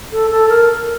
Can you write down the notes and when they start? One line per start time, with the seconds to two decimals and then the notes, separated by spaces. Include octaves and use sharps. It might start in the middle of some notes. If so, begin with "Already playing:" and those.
0.12 A4
0.30 A4
0.49 A#4